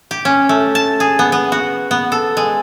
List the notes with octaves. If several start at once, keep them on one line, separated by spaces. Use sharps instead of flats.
G4
C#4
A3
A5
G#4
B3
B3
F#4
B3
A4
G#3